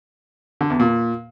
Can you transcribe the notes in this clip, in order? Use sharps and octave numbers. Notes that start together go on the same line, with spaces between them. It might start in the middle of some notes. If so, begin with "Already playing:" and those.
D3
E2
A#2